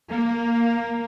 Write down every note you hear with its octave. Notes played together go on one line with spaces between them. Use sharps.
A#3